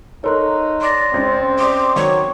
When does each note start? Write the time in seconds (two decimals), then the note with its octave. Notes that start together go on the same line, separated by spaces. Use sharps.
0.24 D#4 A4 A#4 C#5 C6 F#6
0.81 D5 C6 D6 A#6
1.14 C#2 C#3 C4
1.59 D5 C6 D6 D#6
1.96 D#3 F#3 C#5 C#6 D6